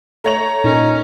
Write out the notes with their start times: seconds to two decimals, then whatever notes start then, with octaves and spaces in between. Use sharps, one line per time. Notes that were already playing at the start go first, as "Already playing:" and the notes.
0.24 A3 C#5 A#5 F7
0.64 A#2 C#4 D#4